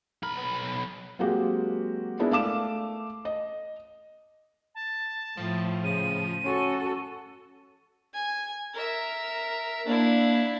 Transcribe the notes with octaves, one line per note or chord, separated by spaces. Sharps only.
B1 A#4 B5
B3
F#3 G#3 A#3 C4 F#4 G4
G#3 B3 D4 E4 A#4
A3 F5 D6 E7
D#5
A5
A2 F3
C#3 D#7
C#4 F#4 A4
G#5
A#4 E5
A#3 D4 E4